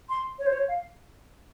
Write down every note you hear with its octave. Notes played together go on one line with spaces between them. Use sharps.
C6
C#5
C5
C#5
F5